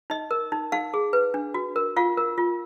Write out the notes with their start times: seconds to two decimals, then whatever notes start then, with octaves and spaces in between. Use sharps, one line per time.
0.10 D#4 D#5
0.31 A#4
0.52 D#4
0.72 D#4 F5
0.94 G#4
1.13 B4
1.34 D4
1.54 F#4
1.76 A#4
1.96 F4 F5
2.17 A#4
2.38 F4